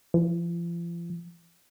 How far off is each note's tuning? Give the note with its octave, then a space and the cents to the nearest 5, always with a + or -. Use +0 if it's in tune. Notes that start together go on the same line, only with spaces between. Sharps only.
F3 -40